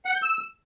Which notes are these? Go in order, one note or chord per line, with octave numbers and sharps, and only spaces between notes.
F#5
G6
E6